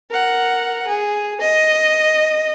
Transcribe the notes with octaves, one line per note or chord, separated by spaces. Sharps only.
A#4 F#5
G#4
D#5